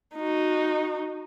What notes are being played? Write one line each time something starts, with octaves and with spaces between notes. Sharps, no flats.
D#4 F#4